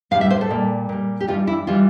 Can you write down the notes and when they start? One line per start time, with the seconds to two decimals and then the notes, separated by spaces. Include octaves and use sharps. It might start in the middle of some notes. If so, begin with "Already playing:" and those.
0.11 A2 G3 F5
0.21 E5
0.30 C5
0.41 A4
0.51 A#2 G3
0.89 A#2 G3
1.20 G4
1.27 G2 E3 G3 F4
1.47 E4
1.67 E3 G3 F4